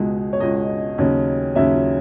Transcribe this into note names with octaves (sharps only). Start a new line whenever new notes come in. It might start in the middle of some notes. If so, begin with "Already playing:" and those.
Already playing: C#2 B2 G#3
C#5
C#2 B2 G#3 D#5
D#2 C#3 F#3 C#4
D#2 C#3 F#3 C#4 E5